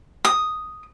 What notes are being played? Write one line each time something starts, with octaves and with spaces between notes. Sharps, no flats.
D#6